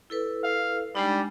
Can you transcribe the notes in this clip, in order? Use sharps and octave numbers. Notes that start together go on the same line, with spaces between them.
E4 A4 B4
F5
G3 G#3 D4 D#4